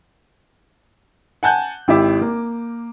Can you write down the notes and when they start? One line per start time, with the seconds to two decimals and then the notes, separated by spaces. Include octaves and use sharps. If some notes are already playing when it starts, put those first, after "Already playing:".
1.43 F#5 G#5 A5 F#6 G6
1.88 G#1 E4 G4 E5 D6
2.21 A#3